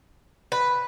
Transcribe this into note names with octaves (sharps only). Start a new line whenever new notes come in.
B4